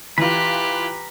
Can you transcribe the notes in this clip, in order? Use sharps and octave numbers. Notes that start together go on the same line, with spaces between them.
E3 F4 G4 B4 A#5 B5